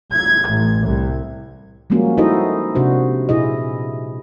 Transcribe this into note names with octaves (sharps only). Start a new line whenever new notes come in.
G#6
A1
C2
F3 G3 G#3 A#3 C#4 F#4
D#4 E4 F#4 A4 C5 D#5
C3 D4 F#4 C5
A#2 E4 G#4 D#5